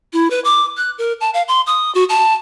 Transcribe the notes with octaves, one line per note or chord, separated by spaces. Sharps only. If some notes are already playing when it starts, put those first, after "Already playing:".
E4
B4
D6
F#6
A#4
A5
F5
C6
D#6
F#4
A5